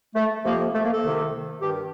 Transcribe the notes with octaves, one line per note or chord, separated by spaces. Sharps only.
A3
F2 C3 F3 A#3
A3
A#3
A4
C2 C3 D#3
G2 D#3 G4